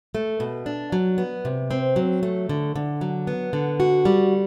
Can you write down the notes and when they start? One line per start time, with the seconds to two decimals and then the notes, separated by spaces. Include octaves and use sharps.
0.15 A3
0.40 B2
0.66 D4
0.92 F#3
1.18 B3
1.45 C3
1.71 C4
1.96 F#3
2.23 A3
2.49 D3
2.76 D3
3.01 F#3
3.27 B3
3.53 D3
3.80 F#4
4.05 G3